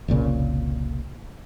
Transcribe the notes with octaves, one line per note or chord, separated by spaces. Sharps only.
F1 C2 A#2 C#3